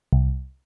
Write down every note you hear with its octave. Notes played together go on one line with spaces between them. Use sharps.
C2